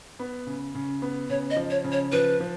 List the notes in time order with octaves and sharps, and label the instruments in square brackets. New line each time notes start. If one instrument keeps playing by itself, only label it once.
[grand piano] B3
C#3
C#3
B3
[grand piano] C#3 [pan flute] C#5
[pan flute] D#5
[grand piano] F3
[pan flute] C#5
[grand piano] C#3
[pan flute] C#5
[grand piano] F3 [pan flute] B4
[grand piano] F3